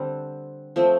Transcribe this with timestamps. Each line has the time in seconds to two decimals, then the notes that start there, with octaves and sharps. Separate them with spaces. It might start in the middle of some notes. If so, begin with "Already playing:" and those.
Already playing: D3 G3 C4
0.76 F3 A3 C4